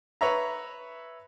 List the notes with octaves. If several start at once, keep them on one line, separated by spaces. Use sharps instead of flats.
B4 C#5 E5 A#5